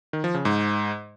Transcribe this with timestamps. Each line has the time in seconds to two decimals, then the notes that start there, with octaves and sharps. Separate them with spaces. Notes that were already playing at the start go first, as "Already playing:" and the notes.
0.13 D#3
0.24 F3
0.34 C#3
0.45 G#2